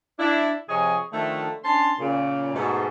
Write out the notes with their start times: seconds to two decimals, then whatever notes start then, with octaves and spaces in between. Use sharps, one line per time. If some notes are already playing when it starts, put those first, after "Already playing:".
0.19 D4 E4
0.69 C3 F3 G#4 C#5 D#5 G#5
1.12 D3 D#3 F3 A3
1.63 C#4 D4 A5 C6
1.99 A#2 C#3
2.54 G#2 B2 A3